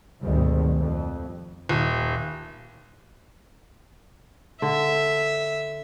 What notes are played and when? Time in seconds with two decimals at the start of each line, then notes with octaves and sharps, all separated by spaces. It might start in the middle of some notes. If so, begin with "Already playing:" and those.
0.23 G#1 D2 B2 D#3 G3 G#3
0.80 F2
1.69 D#1
4.62 D3 E5